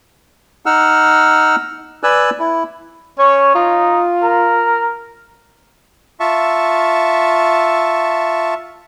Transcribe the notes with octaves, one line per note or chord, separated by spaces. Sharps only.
D#4 F#5 E6 F6
B4 D5 G#5 E6 F#6
E4
C#4 C#5
D#4 F4
A#4
F4 E5 A5 C#6